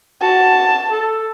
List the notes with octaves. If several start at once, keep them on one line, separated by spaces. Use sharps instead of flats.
F#4 A5
A4